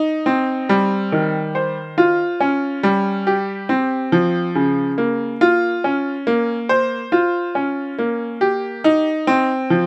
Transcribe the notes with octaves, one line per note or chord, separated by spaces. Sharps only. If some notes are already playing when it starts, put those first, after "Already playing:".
Already playing: D#4
C4
G3
D#3
C5
F4
C#4
G3
G4
C4
F3
C#3
A#3
F4
C#4
A#3
C5
F4
C#4
A#3
G4
D#4
C4
F3